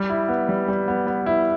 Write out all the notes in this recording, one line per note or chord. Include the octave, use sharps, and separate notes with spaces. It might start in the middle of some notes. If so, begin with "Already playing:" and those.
Already playing: G3
E4
B3
G3
G3
B3
B3
E4